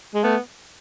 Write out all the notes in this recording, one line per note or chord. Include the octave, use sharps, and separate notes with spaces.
G#3
A3 B3